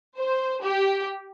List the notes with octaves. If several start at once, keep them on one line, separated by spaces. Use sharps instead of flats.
C5
G4